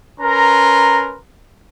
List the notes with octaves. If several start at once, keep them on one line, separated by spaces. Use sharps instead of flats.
C#4 A#4 B4 A#5 C6